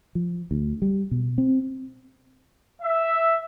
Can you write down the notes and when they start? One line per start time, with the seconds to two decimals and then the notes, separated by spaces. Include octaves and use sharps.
0.15 F3
0.51 D2
0.82 G3
1.11 B2
1.38 C4
2.82 E5